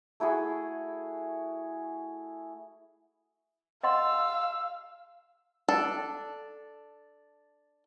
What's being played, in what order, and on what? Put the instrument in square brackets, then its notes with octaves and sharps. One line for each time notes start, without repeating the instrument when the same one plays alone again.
[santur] A3 E4 F#4 G#4
[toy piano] D#5 F#5 C6 [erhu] F5 [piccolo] E6
[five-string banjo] D4 A4